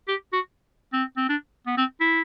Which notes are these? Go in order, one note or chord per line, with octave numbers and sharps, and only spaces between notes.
G4
F#4
C4
C4
D4
B3
C4
E4